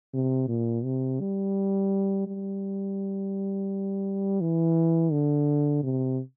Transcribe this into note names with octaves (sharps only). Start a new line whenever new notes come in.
C3
A#2
C3
G3
G3
E3
D3
C3